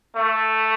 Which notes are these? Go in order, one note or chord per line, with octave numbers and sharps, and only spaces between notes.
A3